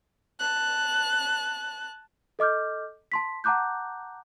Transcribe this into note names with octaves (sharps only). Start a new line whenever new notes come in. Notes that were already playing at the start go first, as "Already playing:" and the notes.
A5 F#6
A4 D#5 D6 F6 G6
A5 C6 B6
F#5 A5 A#5 D6 F#6 G6